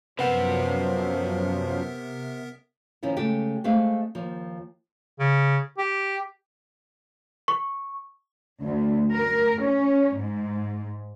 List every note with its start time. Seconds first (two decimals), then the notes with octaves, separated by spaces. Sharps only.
0.19 F#2 C3 F3 B3 A#4 B4 E5 F#5
3.03 D#3 F3 C4 C#4 E4 F4
3.17 C#3 G#3 A3 G4
3.64 G#3 A3 C4 G#4 F5
4.15 D#2 F3
5.20 C#3
5.78 G4
7.48 C#6
8.63 D2
9.13 A#4
9.62 C#4
10.16 G#2